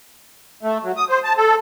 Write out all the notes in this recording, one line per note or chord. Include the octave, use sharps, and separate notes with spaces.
A3
F#3
D#6
C5
A5
A4